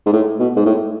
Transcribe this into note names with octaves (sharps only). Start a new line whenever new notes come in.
G#2
A2
B2
G#2
A2